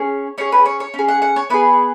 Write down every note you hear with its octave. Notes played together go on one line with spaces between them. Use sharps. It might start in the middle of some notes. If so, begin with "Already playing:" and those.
Already playing: C#4 G#4 C#5
C#4 G#4 C#5
B4
C#5
C#5
C#4
G#4
F#5
F#5
C#5
B3 E4 G#4 B4